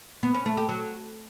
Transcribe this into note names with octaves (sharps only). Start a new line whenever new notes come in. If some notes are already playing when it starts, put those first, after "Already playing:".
B3
C#4
A3
G4
F#3